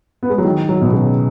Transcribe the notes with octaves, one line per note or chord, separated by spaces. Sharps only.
B3
G#3
F#3
D#3
F#3
B2
C#3